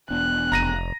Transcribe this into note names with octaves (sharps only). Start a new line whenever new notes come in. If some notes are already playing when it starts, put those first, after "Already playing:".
E1 B3 D4 F#6
F1 A#5 A#6 D#7